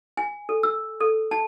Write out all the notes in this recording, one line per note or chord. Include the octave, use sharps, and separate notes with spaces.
G#5
A4
E6
A4
A5